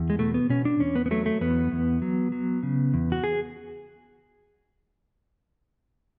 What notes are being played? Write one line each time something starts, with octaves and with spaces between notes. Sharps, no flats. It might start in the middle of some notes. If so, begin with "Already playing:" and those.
Already playing: E2
G#3
B2 A3
B3
B2 C#4
D4
E2 C#4
B3
B3
F#3 A3
A3
E2 B3
E2
F#3
F#3
C#3
E2
F#4
G#4